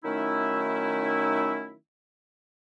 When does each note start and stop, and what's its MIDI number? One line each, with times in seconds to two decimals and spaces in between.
0.04 1.74 51
0.04 1.74 54
0.04 1.74 57
0.04 1.74 61
0.04 1.74 63
0.04 1.74 64